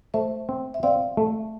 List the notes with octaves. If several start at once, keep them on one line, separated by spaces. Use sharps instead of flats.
A3 C5 E5
C4
E5
C4 D5 F5
A3